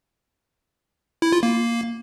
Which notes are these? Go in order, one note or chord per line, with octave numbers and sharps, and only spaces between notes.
E4
F4
A#3